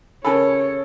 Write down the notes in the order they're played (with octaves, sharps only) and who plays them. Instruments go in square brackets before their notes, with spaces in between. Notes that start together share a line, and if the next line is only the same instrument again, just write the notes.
[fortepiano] C#3 A4 [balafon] A#4 G#5 B5 [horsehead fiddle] C#5